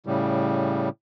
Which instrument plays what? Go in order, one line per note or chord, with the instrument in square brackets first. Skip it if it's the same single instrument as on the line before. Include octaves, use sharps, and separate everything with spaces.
[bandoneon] A2 C#3 G3